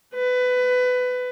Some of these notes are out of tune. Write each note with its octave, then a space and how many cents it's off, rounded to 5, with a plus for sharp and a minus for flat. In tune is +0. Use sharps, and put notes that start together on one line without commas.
B4 +20